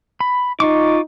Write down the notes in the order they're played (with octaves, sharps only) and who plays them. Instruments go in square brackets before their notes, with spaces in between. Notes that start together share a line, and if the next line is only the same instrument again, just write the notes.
[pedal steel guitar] B5
[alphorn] D#4 [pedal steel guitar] F4 C#6 D6